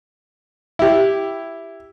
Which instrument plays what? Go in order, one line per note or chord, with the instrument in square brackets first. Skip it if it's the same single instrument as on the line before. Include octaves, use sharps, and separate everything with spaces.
[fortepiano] E4 G4